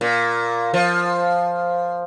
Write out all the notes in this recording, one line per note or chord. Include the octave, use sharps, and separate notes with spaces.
A#2
F3